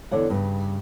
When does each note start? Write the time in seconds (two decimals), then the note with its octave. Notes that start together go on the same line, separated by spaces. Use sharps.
0.11 E2 D3 D4 C#5 F#5
0.30 G2 C#3